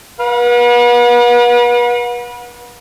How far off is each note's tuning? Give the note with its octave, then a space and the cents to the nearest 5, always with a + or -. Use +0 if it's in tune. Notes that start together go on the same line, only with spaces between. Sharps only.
B4 -35 F#5 -40